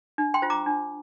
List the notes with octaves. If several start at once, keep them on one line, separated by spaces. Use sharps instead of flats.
D4
G5 C6
F4 C5
A#5 D6
D4